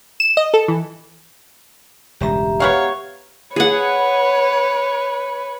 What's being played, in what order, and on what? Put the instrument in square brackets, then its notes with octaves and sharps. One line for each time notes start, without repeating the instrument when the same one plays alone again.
[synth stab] E7
D#5
A4
E3
[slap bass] E1 C#2 G2 [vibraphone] G4 E5 A#5
[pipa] B3 F#4 F5 [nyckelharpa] C#5
[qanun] G#4 F#5 [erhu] B4 [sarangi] C#5